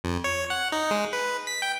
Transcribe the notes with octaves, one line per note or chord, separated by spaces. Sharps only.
F2
C#5
F#5
D#4
G#3
B4
B6
G5